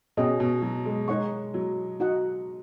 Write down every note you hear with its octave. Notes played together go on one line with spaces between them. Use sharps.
B2 C#4 G#4 D#5
B2
F#3
G#3
G#3 D#4 G#4 C#5 F#5 C#6
F#3
D#4 F#4 D#5 F#5